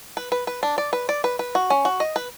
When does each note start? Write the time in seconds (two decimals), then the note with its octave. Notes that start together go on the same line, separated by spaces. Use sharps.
0.17 B4
0.32 B4
0.47 B4
0.63 D4
0.78 D5
0.93 B4
1.09 D5
1.24 B4
1.39 B4
1.55 F#4
1.70 C#4
1.85 F#4
2.00 D#5
2.16 B4